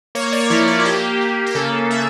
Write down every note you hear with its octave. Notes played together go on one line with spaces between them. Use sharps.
A#3 C#5
D5
F3 E4
E4
F4
A#3 G4
A#3
G4
C#3 A4
A#3 E5